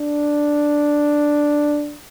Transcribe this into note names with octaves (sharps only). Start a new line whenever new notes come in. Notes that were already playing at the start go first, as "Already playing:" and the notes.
Already playing: D4